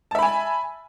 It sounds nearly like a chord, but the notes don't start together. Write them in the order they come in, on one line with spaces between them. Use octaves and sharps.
A5 E5 B5 G#5